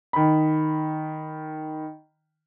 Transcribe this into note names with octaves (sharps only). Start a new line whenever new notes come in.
D#3 B5